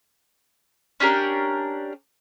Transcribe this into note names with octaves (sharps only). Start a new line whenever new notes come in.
C#4 D4 G4 A#4